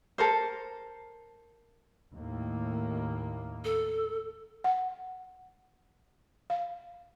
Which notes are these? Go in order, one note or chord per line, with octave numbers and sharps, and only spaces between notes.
A4 A#4 C5
D#2 A2 A#3
A4
F#5
F5